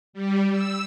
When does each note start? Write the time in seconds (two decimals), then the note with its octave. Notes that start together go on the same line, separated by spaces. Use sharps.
0.13 G3
0.51 E6